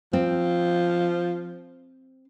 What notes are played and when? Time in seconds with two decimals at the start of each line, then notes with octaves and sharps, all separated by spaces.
0.13 F3 C4